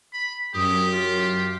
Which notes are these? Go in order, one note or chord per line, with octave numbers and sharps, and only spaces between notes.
B5
F#2 G4 D#6
F4